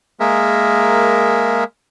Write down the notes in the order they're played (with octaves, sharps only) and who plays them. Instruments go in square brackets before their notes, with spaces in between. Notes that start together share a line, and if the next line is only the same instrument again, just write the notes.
[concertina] G#3 A#3 G#4 A#4 E5